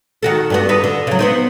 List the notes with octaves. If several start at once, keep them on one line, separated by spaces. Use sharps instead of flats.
D#3 F#4 A4
G2 B3 F#4
D#4 A4 B4
D3
C#3 F#3
B3 C4 D#4